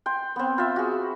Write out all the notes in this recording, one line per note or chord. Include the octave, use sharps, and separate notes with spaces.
G5 C6
B3 C4
F4 E5
F#4 G#4